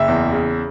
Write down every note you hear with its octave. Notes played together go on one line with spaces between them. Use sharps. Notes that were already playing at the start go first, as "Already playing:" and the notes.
Already playing: F#1 E5
E2
C#3